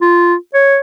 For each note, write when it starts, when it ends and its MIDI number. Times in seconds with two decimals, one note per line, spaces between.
0.02 0.35 65
0.54 0.79 73